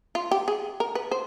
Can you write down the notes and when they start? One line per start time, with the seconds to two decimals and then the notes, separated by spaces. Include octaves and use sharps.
0.15 F4
0.31 G4
0.48 G#4
0.80 A#4
0.95 B4
1.11 C5